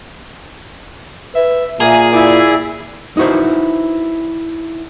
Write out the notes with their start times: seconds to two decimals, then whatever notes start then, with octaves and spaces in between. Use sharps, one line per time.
1.35 B4 E5
1.80 A#2 A#3 G#4 E5
2.13 E4 D5
3.17 D#4 E4 F#4 B4 C5